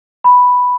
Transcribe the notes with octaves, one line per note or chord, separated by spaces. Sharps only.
B5